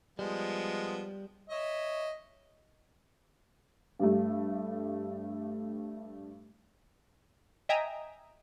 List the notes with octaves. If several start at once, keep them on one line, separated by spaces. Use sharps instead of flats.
F3 G3 G#3 B3
C#5 D#5 E5
G2 G3 A3
D#5 E5 G5 G#5 A#5 D#6